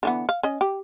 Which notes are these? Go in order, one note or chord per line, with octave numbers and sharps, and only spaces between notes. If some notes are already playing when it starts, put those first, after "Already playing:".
D3 E3 B3
F5
C#4 D#5
G4